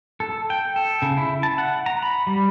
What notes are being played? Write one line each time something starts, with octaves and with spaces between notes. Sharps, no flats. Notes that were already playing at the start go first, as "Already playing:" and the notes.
A4
G5
A4
C#3
E4
A5
F#5
A#5
B5
G3